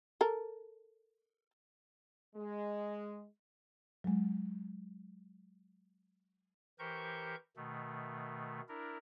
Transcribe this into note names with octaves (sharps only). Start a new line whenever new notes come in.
A4 A#4
G#3
F#3 G#3
E3 G4 A#4 C5 C#6 G6
B2 D#3 A3
D4 E4 A#4